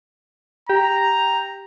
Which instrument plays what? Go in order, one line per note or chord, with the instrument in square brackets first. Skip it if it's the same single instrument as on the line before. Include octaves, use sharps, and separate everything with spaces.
[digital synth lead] G4 [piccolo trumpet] A#5